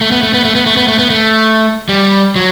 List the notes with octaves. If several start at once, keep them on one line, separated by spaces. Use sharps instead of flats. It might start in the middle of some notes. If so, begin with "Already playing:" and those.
A3
B3
A3
B3
A3
B3
A3
B3
A3
B3
A3
G3
F#3